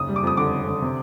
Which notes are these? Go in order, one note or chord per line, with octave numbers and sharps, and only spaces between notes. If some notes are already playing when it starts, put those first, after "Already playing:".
Already playing: F#1 D#2 D#6
G3
D6
F2 D#6
D3 D6
F2
D3
C3